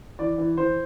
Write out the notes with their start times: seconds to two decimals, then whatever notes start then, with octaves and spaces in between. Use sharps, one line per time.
0.19 E3 D5
0.38 E3
0.57 E3 C5